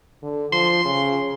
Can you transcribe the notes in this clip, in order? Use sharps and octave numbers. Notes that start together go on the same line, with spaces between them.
D3
F3 C6
C#3